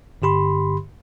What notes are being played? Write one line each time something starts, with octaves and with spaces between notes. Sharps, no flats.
G2 D3 G4 B5 C6